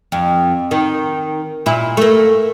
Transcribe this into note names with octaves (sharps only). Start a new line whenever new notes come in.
F2
D#3
A#2 E4
A3 A#3